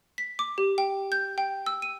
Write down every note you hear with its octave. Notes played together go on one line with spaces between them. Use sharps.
B6
D6
G4
G5
G6
G5
E6
D#7